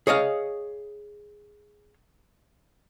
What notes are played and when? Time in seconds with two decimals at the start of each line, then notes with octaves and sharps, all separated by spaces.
0.07 G#4 C#5 D#5 F5